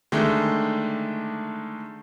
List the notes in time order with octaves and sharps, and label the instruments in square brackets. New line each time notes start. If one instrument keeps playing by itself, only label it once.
[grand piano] D3 D#3 G#3 A3 D4